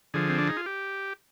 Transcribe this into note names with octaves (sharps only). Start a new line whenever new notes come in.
D3 F3 G#4
C4
D4
D#4
F4
G4